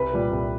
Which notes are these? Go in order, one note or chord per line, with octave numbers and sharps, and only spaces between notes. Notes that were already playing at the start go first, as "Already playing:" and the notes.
Already playing: C2 B4
A#2 G3
C2